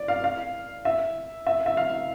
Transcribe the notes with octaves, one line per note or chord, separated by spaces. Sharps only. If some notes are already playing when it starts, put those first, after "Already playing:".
Already playing: D5
F5
F5
E5
E5
E5
F5